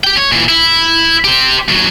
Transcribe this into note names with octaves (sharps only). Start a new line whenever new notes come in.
G4 G5
C#5
A#2 E3
E4
G4 C5
D#2 F#3